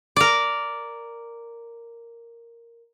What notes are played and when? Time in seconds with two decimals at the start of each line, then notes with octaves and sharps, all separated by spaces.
0.16 A#4 D5